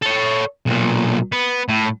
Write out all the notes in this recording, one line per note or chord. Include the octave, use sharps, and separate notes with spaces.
A4 C#5
B1 A#2
B3
A2